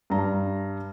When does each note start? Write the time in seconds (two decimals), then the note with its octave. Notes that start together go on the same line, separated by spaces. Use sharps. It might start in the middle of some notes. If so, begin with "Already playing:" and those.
0.10 G2 A#5